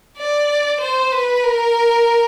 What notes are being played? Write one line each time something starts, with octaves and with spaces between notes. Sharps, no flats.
D5
C5
B4
A#4